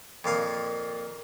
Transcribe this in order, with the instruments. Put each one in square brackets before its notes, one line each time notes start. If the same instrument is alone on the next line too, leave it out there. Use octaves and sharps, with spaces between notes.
[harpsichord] F2 A#2 F5 D#6